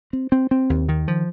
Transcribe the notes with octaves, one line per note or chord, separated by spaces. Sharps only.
C4
C4
C4
D#2
D#3
F3